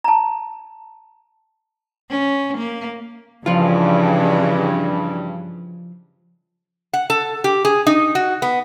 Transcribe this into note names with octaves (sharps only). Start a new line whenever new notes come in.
A5 A#5
C#4
A#3
G2 C#3 E3 F3 G#3 F4
F#5
A4
G4
G#4
D#4
F#4
B3